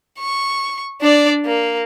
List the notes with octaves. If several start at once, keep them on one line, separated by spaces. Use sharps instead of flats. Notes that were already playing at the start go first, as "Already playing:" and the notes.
C#6
D4 D5
A#3